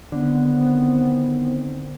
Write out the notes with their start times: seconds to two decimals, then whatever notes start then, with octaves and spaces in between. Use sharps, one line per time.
0.12 A2 D3 D#3 B3 C4